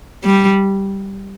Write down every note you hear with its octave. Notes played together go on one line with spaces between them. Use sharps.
G3